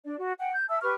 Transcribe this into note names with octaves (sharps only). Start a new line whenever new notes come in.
D4 D5
F#4
F#5 G5
G6
E5 A5 E6
G4 B4 C#6 F6